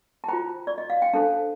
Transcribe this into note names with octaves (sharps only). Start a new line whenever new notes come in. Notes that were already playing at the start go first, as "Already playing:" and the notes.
A5
F4 C5 G5 A#5
D5
D#5
F5
G5
D4 A4 C5 F5 A5